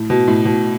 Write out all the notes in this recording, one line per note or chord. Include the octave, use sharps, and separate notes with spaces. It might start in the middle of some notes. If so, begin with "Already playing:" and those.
Already playing: A2
B2
A2
B2